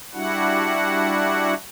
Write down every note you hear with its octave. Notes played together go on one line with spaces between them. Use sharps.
G3 D4 E4 F#4 F#5